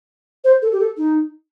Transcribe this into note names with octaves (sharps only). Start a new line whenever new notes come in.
C5
A4
G4
A4
D#4